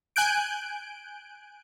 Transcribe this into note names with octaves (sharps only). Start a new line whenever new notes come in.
G#5 F#6 G6 D7